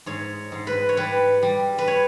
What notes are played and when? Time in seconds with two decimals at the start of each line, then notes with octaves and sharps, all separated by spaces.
0.06 G#2 C#5
0.52 G#2
0.67 B4
0.89 C#5
0.97 G3 B4
1.43 G3
1.78 B4
1.88 C#5